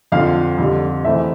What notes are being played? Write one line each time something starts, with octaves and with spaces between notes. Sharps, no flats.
F2 D3 F3 F5
F2 D3 G3
E2 E3 A3 C4 E5